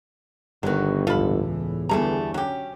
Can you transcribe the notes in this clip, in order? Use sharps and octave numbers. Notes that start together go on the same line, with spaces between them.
G1 D3 D#3 F#3 B3 F#4
C#2 A2 E3 F4 A4 B5
E2
D3 E3 G3 A3 B3 G#4 A4 A#5
F#3 C#4 G4